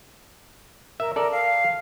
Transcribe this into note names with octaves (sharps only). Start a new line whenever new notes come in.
A#4 E5
A4 A#4 D5
F5